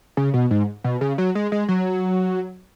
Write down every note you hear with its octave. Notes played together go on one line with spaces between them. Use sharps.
C#3
B2
G#2
B2
C#3
F#3
G#3
G#3
F#3